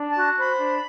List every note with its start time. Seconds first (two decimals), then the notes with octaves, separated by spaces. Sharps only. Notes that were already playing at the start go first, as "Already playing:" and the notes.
Already playing: D4
0.09 A5
0.16 F#4
0.38 C5 B5
0.59 D4